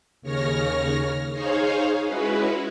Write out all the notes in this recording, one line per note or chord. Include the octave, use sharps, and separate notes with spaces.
D#2 C#3 C#5 F6 A#6
D#4 G#4 C5 C#5 F5
G#3 C#4 E4 F#4 B4